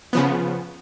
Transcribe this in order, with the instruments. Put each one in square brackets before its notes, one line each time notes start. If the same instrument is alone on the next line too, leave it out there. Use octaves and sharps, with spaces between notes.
[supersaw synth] C#3 F3 B3